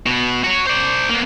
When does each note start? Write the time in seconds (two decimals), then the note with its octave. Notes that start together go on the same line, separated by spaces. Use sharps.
0.06 B2 B3
0.44 F#4 C#5
0.67 C5 D5
1.09 A#3 B3